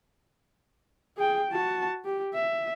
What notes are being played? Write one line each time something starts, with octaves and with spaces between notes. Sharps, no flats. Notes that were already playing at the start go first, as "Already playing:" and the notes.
G#4 G5
F#4 A5
G4
E5